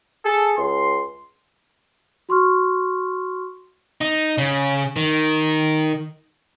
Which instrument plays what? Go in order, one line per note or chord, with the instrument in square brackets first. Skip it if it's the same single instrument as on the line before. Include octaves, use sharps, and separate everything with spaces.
[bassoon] G#4 [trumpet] A4
[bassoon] C#2 [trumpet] C6
[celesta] F#4 C6 C#6 F6
[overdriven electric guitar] D#4
C#3
D#3